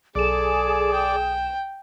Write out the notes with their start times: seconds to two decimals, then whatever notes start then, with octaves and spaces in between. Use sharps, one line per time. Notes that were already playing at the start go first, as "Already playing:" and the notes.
0.15 B1 G#4 A4 D5 E7
0.92 G5